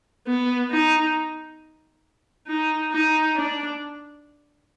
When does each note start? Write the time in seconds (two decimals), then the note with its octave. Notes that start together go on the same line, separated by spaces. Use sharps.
0.27 B3
0.71 D#4
2.48 D#4
2.92 D#4
3.36 D4